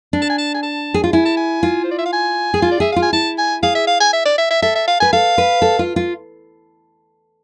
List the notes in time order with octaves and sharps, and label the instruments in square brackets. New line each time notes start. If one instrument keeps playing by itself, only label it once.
[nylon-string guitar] D4
[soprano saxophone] A5
G#5
A5
G#5
A5
[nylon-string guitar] G#4
F4
[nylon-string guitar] E4 [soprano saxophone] G#5
[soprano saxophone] A5
G#5
[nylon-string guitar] F4
[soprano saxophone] C5
D5
E5
F5
G#5
[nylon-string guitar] G#4
F4
[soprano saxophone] D5
[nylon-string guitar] G#4 [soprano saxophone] E5
[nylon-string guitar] F4 [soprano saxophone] F5
[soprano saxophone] G#5
[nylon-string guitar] E4 [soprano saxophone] A5
[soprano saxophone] G#5
[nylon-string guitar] G#4 [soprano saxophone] F5
[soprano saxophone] E5
F5
G#5
E5
D5
E5
E5
[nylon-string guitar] A4 [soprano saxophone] E5
[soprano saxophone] E5
F5
[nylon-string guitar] B4 [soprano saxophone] G#5
[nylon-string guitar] A4 [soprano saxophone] F5
[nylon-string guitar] B4
A4
F4
F4